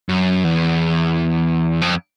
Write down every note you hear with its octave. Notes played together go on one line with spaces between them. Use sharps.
F#2
E2
F2